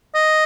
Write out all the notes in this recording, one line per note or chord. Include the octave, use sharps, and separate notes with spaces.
D#5